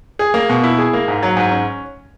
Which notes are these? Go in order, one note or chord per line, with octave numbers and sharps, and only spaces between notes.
G#4
A#3
B2
E4
G#4
A#3
G#2
F#3
G#2
C#4